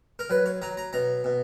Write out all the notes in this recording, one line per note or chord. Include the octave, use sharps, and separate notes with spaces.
A#4
F#3 B4
C#5
F#3 A#5
A#5
B2 A#5
B2